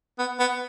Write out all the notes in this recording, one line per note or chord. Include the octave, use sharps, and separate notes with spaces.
B3
B3